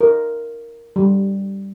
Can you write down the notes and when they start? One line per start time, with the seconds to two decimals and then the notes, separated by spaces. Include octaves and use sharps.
0.01 A#4
0.96 G3